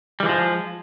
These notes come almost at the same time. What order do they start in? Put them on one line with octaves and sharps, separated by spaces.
G3 E3 G#3 F3